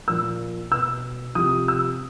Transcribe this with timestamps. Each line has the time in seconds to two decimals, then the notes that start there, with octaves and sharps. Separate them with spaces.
0.08 A#2 F3 E6
0.71 B2 E6
1.35 C3 F3 D#6
1.68 E6